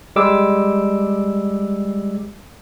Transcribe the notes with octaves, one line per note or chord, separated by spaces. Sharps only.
G3 G#3 D6 E6